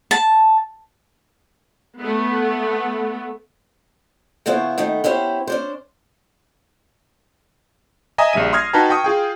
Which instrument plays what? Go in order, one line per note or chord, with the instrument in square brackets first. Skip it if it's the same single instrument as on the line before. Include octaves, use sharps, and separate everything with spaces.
[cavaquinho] A5
[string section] A3 B3
[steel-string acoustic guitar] C#3 F3 B3 E4 C5 C#5
D#3 A3 B3 D#4
B3 C#4 E4 G4 C5
C#4 D4 C5
[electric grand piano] D#5 E5 G#5 A#5 D#6
A#1 C#3 G3 E5 D#7
C6 D#6 F6 G#6 A#6 C7
D#4 F#4 B4 G5 A5 A#5
G5 C#6 D#6
F4 G#4 G5